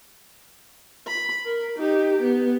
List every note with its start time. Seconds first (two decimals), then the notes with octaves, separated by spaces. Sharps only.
1.07 B5
1.44 A#4
1.77 D#4 G4
2.22 B3